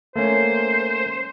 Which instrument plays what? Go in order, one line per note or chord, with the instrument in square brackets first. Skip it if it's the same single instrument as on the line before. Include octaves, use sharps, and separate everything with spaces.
[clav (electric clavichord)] A3 A#3 C#4 [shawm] C5